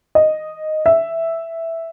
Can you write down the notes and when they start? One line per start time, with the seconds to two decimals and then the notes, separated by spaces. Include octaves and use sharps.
0.15 D#5
0.86 E5